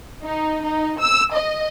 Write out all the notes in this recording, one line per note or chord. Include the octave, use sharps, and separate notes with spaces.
D#4
D#4
E6
D#5